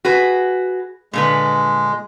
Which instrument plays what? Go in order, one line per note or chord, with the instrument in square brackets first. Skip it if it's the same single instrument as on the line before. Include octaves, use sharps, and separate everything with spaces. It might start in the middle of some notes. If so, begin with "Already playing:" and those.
[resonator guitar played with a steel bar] F#4 G#4 B4
[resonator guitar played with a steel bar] A#2 D3 B4 [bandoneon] G#3